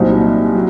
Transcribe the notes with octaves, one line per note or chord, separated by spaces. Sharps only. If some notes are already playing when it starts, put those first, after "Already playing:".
Already playing: C2 A#2 F#3 C4 D#4
F#3